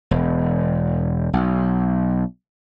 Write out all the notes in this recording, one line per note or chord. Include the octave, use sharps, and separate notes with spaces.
E1
B1